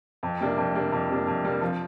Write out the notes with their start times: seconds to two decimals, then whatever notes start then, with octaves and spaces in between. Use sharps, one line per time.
0.23 F2
0.40 C3 G3 A#3 D4
0.57 F2
0.75 C3 G3 A#3 D4
0.92 F2
1.10 C3 G3 A#3 D4
1.27 F2
1.44 C3 G3 A#3 D4
1.61 F3